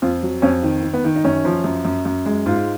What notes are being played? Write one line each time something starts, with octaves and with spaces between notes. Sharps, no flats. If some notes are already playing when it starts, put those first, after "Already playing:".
F2 F4
F#3
F2 C#4
D#3
D#3
B3
D#3
D#4
F#2 C#4
F3
F#2
F#2
F#2
G#3
G#2 F4